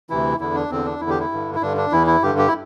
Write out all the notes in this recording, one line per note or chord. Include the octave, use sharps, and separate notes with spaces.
D2 C3 E3 E4
E2 D3 E4
D4
E2 D3 C4
D4
E2 D3 E4
G4
E4
G2 D3
E4
G2 D3 D4
D4
E2 E3 E4
E4
G2 D3 G4
G4
E4